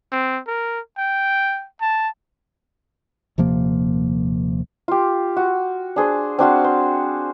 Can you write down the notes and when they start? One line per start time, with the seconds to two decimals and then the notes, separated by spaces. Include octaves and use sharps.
0.12 C4
0.48 A#4
0.98 G5
1.81 A5
3.38 D#1 C3 F3 A#3
4.88 F4 G4
5.37 F#4
5.96 D4 G#4 C5
6.39 C4 D4 F#4 F5
6.64 C5